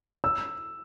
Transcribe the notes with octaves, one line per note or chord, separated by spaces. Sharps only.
E6